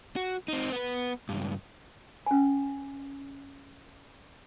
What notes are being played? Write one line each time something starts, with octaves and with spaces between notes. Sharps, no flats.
F#4
C4 D#4
B3 B4
C#2 G2
C#4 G#5